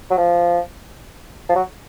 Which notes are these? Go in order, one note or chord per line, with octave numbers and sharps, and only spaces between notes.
F#3
F3
F3
F#3